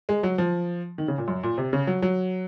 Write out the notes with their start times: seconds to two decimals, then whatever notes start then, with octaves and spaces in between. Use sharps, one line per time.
0.09 G#3
0.23 F#3
0.38 F3
0.98 D#3
1.08 C#3
1.18 A#2
1.28 F#2
1.43 A#2
1.58 C3
1.73 C#3
1.87 F#3
2.02 F#3